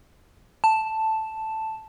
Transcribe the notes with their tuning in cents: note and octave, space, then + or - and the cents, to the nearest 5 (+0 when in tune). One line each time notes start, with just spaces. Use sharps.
A5 +0